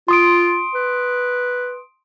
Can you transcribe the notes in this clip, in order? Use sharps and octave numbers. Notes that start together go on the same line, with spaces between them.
F4 C6 D#6 D7
B4